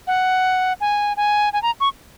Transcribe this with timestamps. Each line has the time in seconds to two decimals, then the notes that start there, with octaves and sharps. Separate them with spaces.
0.07 F#5
0.81 G#5
1.17 G#5
1.53 G#5
1.62 A#5
1.80 C#6